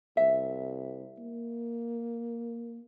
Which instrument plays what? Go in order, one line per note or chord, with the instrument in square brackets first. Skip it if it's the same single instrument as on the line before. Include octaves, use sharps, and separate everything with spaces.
[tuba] C2 [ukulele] E5
[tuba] A#3